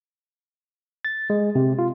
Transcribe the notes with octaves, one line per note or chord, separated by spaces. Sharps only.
A6
G#3
C3
F4